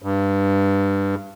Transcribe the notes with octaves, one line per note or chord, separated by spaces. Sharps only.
G2